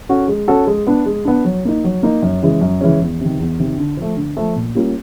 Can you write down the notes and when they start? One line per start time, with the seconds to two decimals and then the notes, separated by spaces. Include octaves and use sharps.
0.09 C#4 F#4 A4
0.28 G#3
0.48 C#4 F#4 A4
0.67 G#3
0.87 B3 D4
1.06 G#3
1.25 B3 D4
1.45 F#3
1.65 A#3 D#4
1.84 F#3
2.03 A#3 D#4
2.22 F#2
2.43 C#3 E3 G#3 C#4
2.61 F#2
2.81 C#3 E3 G#3 C#4
3.01 E2
3.21 C3 D#3
3.40 E2
3.60 C3 D#3
3.78 D3
3.97 F3 A3
4.17 D3
4.37 F3 A3
4.56 A#2
4.75 G3 A#3 C#4 F4